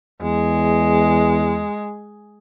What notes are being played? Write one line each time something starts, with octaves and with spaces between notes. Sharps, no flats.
E2 G#3